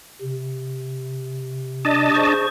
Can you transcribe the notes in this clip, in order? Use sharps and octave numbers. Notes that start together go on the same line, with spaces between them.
C3
D4 D#5 A5
G#4 C5 C#6